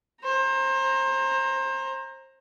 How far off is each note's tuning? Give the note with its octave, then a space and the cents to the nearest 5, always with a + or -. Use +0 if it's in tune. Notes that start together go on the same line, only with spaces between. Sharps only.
C5 +30 A#5 +0